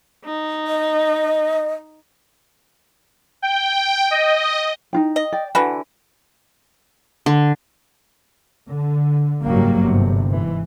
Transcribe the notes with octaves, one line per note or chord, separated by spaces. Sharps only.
D#4
D#5
G5
D#5
D#4 F4 G5
D#5
D5 G5
D3 E3 F#4 B5
D3
D3
F#1 G#2 C#3 F#3 G3 A#3
G1 G#2 C3
G#2 E3